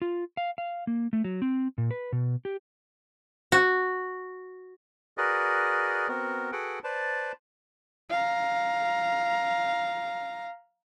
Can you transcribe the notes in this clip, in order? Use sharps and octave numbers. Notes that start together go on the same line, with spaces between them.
F4
F5
F5
A#3
A3
F#3
C4
A#2
B4
B2
G4
F#4
F#4 G#4 A#4 B4 D5 D#5
B3 C4 F#4 A#4
F#4 G#4 A4 B4 F#5 G5
B4 C5 D5 A5
F5 A#5